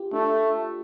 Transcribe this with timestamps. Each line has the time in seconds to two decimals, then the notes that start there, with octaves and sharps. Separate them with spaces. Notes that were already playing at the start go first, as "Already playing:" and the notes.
Already playing: F4 G4
0.13 A3 D4